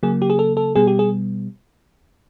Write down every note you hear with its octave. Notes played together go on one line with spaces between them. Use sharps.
C#3 F#3 A#3 G#4
G4
G#4
A4
A4
B2 G3 B3 G#4
G4
G#4